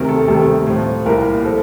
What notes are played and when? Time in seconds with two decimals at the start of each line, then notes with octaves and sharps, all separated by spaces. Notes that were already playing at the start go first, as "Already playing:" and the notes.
Already playing: D2 C3 D#3 A#4
0.09 A4
0.28 D2 C3 D#3 G3 A4
0.67 A2 F3
1.05 C2 A#2 G3 A#4
1.44 F3 A4